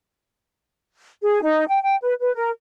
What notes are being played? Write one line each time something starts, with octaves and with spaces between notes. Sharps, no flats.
G#4
D#4
G5
G5
B4
B4
A#4